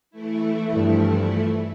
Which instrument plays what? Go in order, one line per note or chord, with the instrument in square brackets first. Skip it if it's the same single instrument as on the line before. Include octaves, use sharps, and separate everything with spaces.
[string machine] E3 A3 E4
[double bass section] G2 F3